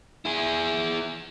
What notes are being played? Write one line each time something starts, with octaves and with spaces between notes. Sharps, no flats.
E4 G#4